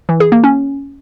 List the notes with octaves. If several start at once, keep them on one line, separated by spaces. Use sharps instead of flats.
E3
G#4
A#3
C#4